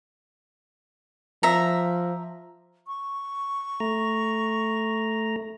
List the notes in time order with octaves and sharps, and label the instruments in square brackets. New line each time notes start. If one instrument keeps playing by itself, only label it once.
[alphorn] F3 [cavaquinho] E5 A#5
[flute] C#6
[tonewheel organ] A3 A#5